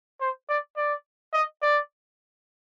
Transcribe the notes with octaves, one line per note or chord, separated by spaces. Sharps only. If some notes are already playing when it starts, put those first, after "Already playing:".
C5
D5
D5
D#5
D5